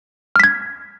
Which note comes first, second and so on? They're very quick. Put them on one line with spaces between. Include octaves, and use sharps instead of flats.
F6 B6 G#6